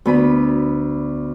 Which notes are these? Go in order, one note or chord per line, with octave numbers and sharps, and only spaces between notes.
D2 B3 B5